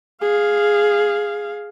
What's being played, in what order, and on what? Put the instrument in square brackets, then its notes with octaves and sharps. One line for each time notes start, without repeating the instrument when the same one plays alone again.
[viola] G#4 F5